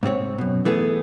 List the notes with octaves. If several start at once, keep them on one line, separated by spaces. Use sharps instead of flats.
G#2 C3 C4 C#5
F#2 B2
E3 A3 B3 G#4